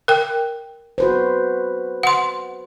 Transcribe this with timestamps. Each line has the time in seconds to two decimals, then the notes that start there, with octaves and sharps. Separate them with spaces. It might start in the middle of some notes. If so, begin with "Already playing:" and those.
0.08 A#4 G5
0.98 F#4 B4 C5
2.03 F#5 C6